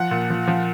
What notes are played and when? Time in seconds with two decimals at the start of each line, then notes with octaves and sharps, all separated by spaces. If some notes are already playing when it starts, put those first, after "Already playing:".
Already playing: F3 F#5
0.11 A#2
0.30 F3
0.47 F3